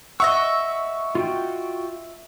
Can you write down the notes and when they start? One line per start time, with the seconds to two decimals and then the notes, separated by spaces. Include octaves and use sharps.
0.20 D#5 E5 F#5 C#6 E6
1.15 F4 F#4 G5